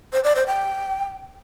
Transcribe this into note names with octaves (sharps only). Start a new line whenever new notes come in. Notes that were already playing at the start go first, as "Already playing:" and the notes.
C5
D5
C5
G5